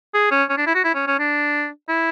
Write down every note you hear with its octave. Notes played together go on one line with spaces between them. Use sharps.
G#4
C#4
C#4
D4
E4
F#4
E4
C#4
C#4
D4
E4